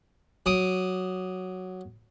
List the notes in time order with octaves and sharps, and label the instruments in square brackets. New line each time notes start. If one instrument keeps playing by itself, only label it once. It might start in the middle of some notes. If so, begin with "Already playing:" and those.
[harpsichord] F#3 D6 D#6